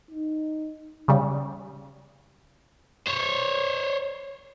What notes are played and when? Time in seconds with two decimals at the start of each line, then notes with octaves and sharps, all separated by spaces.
0.11 D#4
1.08 C#3 G3
3.07 C5 C#5